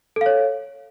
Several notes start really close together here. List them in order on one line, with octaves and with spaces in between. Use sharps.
A4 F5 C#5